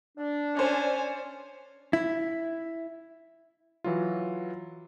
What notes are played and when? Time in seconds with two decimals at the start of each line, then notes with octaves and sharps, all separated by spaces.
0.17 D4
0.57 C#4 C5 D5 G#5
1.93 E4
3.84 E3 F#3 F4